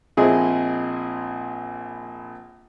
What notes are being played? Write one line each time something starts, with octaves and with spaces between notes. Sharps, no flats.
A#1 C4 E4 G#4 D#5